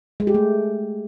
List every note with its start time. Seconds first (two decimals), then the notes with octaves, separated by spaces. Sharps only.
0.20 G#3
0.27 G4
0.34 A3